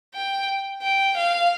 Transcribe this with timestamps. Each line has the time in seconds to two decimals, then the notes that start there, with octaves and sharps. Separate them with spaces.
0.15 G5
0.83 G5
1.17 F5